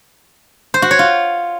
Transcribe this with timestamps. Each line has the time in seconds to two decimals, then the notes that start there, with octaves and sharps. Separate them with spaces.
0.74 C5
0.82 F#4
0.91 C#5
0.99 F4